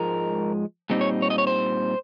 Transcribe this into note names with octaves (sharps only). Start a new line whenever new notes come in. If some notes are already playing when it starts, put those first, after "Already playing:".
Already playing: G#2 F3 G#3 A#4
A#2 G3 C4 D#4
C#5
C#5
D#5
C#5
C5